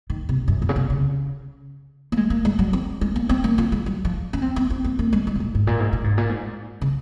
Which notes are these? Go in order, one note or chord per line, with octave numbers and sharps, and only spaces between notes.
D#3
C3
F#2
A#2
C#3
C3
C#3
A#3
G#3
A#3
G#3
F#3
C4
G#3
A#3
C4
A#3
F3
G#3
F#3
F3
C#4
C4
C4
C4
C4
A#3
G#3
G#3
C3
A#2
G#2
A#2
G#2
A#2
G#2
A#2
G#2
C#3